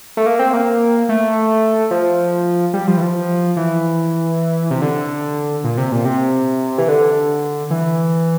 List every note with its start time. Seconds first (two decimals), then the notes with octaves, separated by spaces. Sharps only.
0.17 A3
0.26 A#3
0.39 C4
0.53 A#3
1.09 A3
1.91 F3
2.74 G3
2.87 F3
2.97 E3
3.02 F3
3.57 E3
4.71 C3
4.82 D3
5.64 A#2
5.77 C3
5.92 A#2
6.05 C3
6.78 E3
6.88 D3
7.71 E3